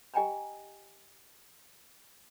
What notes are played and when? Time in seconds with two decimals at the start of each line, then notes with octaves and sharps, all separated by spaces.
0.14 G4 D#5 G5 G#5 A#5 B5